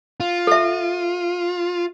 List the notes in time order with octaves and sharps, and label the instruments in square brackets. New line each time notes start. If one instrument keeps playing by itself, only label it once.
[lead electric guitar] F4
[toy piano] A4 E5